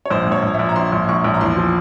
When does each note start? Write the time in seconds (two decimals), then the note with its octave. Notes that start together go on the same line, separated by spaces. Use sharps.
0.06 C#5
0.11 A#1 C5
0.27 A#1 C#5
0.43 A#1
0.54 E5
0.59 A#1
0.69 A#5
0.76 A#1 C6
0.92 A#1
1.09 A#1 C#6
1.24 A#1
1.34 A#5
1.41 E2 C6
1.57 F3